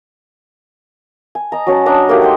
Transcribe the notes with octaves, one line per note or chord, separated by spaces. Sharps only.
G#5
D#5 A#5
F#3 C#4 F#5 A5
D4 D#5 A#5
A3 A#3 D#4 G4
F#5 G5 C6